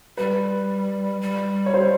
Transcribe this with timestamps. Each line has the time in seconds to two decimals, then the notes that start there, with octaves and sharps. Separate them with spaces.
0.17 G3 B4
1.21 G3
1.66 C#5
1.74 C5